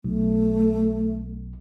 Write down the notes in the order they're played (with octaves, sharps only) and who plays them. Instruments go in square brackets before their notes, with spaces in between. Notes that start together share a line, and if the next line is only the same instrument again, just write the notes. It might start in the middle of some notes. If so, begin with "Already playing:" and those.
[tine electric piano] B1 [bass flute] A3